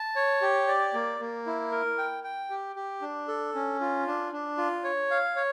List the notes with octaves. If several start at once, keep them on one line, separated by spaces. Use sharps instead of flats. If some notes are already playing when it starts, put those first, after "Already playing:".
Already playing: A5
C#5
G4
D5
A#3
A#3
E4
A#4
G5
G5
G4
G4
D4
A4
C#4
F4
D4
D4
F4
C#5
F5
C#5